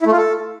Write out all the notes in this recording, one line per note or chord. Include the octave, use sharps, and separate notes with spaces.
E4
A3
F4
A4